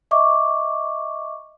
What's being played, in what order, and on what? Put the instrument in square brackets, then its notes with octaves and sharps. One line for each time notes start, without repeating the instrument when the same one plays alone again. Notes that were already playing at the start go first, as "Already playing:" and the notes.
[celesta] D#5 E5 C#6 D6